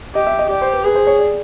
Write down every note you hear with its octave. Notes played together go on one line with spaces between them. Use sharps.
G4 D#5
E5
D#5
G4 D5
C5
B4
G#4 B4
C5
C#5
D5